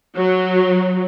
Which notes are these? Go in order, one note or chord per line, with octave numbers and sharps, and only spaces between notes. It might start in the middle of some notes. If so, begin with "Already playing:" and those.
F#3